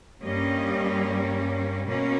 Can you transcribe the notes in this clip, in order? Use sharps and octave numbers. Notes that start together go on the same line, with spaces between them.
G2 G3 A#3 C#4 D#5
B2 A#3 C#4